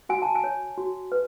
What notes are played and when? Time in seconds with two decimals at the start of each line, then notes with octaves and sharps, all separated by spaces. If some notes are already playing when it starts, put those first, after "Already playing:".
0.09 F#4 G#5
0.22 A5
0.35 G#5
0.44 C#5
0.77 F#4
1.12 B4